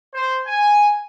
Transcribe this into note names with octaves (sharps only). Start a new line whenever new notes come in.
C5
G#5